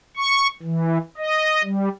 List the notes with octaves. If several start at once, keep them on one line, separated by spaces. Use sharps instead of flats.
C#6
E3
D#5
G3